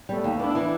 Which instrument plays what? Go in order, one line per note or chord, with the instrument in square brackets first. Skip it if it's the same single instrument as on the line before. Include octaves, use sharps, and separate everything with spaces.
[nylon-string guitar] G3 [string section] A3 B3
[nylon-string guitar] D#2
[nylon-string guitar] B3 [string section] D4 E4
[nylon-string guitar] E3